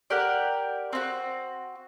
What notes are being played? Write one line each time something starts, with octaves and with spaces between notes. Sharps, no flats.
G4 A#4 D5 F#5
C4 D#4 F#4